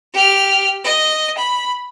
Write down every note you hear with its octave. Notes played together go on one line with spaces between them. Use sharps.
G4 F6
D#5
B5